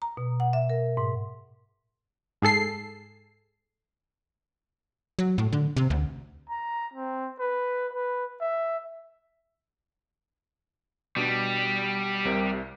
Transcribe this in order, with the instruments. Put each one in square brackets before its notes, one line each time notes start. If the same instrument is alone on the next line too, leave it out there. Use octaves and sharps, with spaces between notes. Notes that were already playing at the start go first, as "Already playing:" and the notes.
[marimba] A#5
B2
F#5
E5
A#4
G#2
[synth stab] G#2 G#4 A4 C7
[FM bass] F#3
A2
D3
C3
D2
[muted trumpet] A#5
C4
B4
B4
E5
[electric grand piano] B2 D4 [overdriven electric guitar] G3
[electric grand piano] C2 C3 A#4